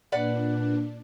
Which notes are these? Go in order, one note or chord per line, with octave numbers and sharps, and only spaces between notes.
A#2 D4 B4 D5 F#5